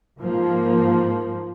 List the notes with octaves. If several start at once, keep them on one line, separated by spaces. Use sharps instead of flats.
G#2 F3 A#3